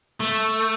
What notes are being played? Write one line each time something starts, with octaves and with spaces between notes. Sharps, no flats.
A3